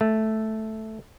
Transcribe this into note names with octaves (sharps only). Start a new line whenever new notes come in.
A3